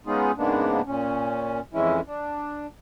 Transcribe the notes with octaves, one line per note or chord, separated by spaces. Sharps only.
G#3 B3 C#4 D#4 F4 G#4
G#2 C#3 G#3 A#3 B3 D4
A#2 C#4
F2 E3 G#3 C#4 E4
D4